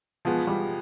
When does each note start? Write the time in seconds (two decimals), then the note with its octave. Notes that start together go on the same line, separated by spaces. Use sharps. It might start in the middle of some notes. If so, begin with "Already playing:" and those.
0.25 B2 F3 G#3 B3
0.47 G3